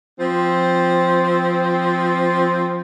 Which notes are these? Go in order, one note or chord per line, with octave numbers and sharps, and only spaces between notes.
F3 C4